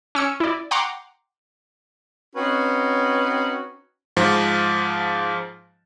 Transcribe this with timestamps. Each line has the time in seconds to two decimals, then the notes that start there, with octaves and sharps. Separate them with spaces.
0.15 C#4 E6 C#7
0.40 E4 D5
0.71 F#5 G5 A#5 C6 D6
2.36 C4 C#4 D#4 F#4 B4
4.17 G#2 F3